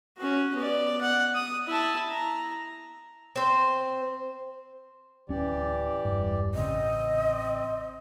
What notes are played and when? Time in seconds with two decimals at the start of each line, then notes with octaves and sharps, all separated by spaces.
0.18 C#4 F#4
0.55 B3 D5
1.01 F#5
1.35 D#6
1.68 E4 A5
2.11 A#5
3.36 C4 C5
5.29 D1 E3 C#4 G4 D5
6.05 E1 G2
6.55 A1 C#3 C4 D#5